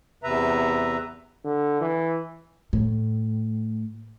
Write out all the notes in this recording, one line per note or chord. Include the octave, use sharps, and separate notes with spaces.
E2 C3 B4 E5 A#5
D3
E3
A2